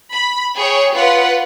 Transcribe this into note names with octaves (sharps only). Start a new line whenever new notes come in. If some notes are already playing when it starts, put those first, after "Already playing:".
B5
G#4 C#5 G5
F4 B4 F#5